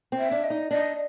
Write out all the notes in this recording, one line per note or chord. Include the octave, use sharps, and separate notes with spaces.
C4
E5
D4
D#5
D#4
D4 D#5